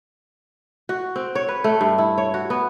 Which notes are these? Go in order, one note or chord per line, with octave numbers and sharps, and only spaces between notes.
F#4
C4
C#5
B4
A3
G2
E4
C#5
F#4
B3